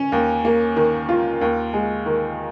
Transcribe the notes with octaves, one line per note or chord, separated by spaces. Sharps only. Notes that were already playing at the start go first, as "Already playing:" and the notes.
Already playing: C#4
D#2
A#3
D#3
F4
D#2
G#3
D#3